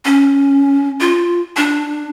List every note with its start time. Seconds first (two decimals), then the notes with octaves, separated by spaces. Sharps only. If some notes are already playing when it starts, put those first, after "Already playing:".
0.05 C#4
1.00 F4
1.57 D4